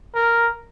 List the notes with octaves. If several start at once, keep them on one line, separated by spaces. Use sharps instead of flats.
A#4